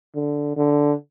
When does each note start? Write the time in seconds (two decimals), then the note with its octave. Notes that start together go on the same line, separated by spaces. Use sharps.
0.15 D3
0.56 D3